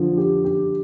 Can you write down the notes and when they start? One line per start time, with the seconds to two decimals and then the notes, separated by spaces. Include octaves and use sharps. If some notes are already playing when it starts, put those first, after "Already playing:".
Already playing: D3 F3
0.18 G4
0.45 G4